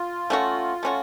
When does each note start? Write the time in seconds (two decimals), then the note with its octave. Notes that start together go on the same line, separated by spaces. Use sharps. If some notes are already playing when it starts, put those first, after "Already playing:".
Already playing: F4
0.30 A3 C#4 F#4
0.83 A3 C#4 F#4